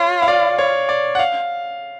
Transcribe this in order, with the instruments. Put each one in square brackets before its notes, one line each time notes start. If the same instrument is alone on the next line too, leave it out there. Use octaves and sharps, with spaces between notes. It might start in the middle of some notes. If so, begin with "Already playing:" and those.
Already playing: [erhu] F4 [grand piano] C#5
[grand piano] F5
D5
C#5
D5
F#5
F5